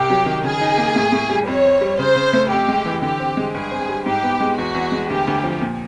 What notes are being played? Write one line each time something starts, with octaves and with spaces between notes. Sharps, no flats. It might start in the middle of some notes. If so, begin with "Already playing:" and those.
Already playing: C2 G4
F#3
D#3
C#3 G#4
D#4
A#3
A2
A2
G3
F2 C#5
C4
G3
C#3 C5
C#3
A3
F2 G4
G#3
E3
D3 G4
C4
G#3
G2 G#4
C4
G3
G#2 G4
B3
G#3
E2 F#4
E2
G#3
D2 G4
D2
F3
A#2